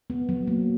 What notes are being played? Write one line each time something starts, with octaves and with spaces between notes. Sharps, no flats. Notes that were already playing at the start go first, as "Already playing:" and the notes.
B3
F#3
A#3